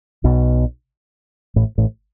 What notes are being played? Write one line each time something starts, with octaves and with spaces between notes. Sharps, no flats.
B1 B2
A1 A2
A1 A2